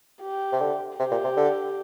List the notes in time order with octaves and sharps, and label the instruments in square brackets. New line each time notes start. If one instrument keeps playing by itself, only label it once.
[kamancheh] G4
[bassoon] C3
D3
[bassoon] C3 [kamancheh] G4
[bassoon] A#2
C3
D3